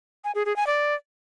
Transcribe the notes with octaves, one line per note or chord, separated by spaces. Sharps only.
G#5
G#4
G#4
G#5
D5